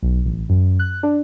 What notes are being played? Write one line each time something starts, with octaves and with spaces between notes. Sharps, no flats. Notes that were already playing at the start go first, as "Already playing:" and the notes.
B1
A1
F#2
F#6
D4